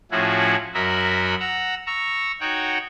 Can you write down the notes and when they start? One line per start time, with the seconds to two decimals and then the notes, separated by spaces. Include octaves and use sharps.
0.11 A2 F3 C#4 E4 F#4 G#4
0.74 F#2 F#4 A#4 D#5 E5 B5
1.40 F#5 A#5 E6
1.87 A#5 C#6 E6
2.40 D#4 F#4 C#5 F#5 G5